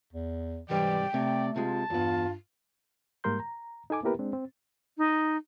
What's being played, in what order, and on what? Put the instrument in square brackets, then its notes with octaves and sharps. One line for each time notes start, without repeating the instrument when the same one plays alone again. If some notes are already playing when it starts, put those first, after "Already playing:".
[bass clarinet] E2
[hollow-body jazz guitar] C2 G#2 G3 [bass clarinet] E3 [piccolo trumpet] D5 [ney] G5
[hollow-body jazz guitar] C3 [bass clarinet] A3 [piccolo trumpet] D5
[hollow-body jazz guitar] C3 G#3 [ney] F4 [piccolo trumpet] A5
[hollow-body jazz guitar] E2 B3 [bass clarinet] G2 [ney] F4
[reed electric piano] G#2 G3 A#3 A#4 C6 G6
A#5
D#4 A4 G#5 D6
A#3 B3 E4 G4 A#4 B4
G#3 C4 D4
C4
[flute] D#4